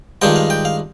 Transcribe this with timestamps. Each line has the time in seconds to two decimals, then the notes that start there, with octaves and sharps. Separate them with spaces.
0.22 G2 D#3 G#3 D4 F4 G5
0.36 F5
0.50 G5
0.65 F5